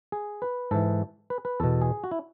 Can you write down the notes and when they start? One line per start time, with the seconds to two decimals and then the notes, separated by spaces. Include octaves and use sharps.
0.12 G#4
0.42 B4
0.71 G#2 E3 A4
1.30 B4
1.45 B4
1.60 E2 B2 A4
1.81 G#4
2.04 F#4
2.11 E4